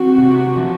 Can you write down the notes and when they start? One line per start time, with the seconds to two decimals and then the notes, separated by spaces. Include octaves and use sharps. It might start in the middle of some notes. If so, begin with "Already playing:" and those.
Already playing: C4 F#4
0.18 C3
0.57 F3